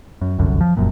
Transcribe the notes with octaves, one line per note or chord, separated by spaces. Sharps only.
F#2
F1 C2 F#2 D3
F3
F1 F#2 A#2